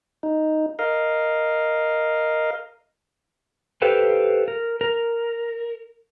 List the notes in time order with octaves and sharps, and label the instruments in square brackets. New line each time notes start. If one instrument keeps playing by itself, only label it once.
[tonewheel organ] D#4
A#4 D#5 F5
[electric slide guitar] G4 A4 B4 C5 F5 G5
A#4
A#4